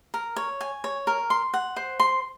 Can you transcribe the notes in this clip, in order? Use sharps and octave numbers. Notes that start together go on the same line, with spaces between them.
A#4
C#5
G#5
C#5
A#4
C6
F#5
C5
C6